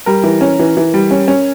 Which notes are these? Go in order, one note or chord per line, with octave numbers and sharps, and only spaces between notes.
G3 A#4
E3
C#4
E3
E3
G3
C#4
C#4